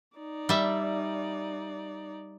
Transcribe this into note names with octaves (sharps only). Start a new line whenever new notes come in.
D#4 D5
G3 E5